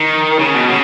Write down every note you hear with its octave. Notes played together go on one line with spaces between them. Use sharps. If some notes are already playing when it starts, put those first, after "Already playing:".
Already playing: D#3
C#3
B2
C#3